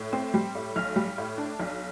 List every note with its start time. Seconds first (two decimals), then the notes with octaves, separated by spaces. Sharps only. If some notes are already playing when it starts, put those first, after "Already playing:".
Already playing: A2
0.13 C4
0.34 G3
0.55 A2
0.76 B1 F6
0.96 G3
1.18 A2
1.37 D4
1.60 B1